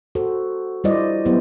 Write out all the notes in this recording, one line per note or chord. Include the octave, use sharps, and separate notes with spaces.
F#4 A4 C5
G3 E4 F4 C5 D5 D#5
F#3 B3 E4 G4 C5